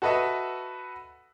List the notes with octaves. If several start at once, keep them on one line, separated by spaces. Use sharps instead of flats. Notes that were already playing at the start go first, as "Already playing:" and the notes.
F#4 A4 B4 D#5 E5